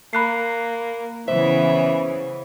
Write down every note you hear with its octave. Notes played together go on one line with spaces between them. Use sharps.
A#3 B5 F#6 C7
C#3 E3 B3 C5 E5